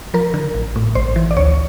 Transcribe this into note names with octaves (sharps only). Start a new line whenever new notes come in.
F3 A#4
D3
A1
A2
A1 C5
E3
D5
D2 C#5